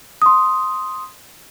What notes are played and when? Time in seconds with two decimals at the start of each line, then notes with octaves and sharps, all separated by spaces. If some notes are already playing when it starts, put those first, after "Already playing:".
0.22 C6 D#6